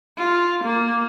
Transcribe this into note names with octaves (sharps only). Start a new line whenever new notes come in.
F4
A#3